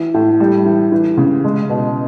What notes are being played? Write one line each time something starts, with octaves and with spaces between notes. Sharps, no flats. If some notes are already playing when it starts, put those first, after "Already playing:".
Already playing: E3
A2
G3
E3
E3
C#3
G#3
B2